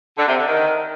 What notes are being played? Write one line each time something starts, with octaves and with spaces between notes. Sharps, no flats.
D3
C3
D3
D#3